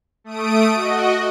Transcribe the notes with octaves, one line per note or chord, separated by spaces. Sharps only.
A3 D#6 D7
F#4 D#5